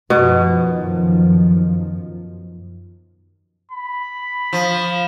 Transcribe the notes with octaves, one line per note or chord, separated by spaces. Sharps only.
F#2 B2 D#3 F3
B5
F3